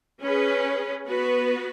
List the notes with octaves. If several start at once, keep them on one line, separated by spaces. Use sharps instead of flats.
C#4 G#4 B4
B3 F#4 B4